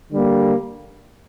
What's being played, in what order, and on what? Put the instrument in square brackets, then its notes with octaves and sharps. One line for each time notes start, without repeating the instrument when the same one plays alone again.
[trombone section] D3 G3 A#3